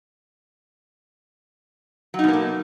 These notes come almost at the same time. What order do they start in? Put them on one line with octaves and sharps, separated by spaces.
F#3 D#4 B2 A#3 A3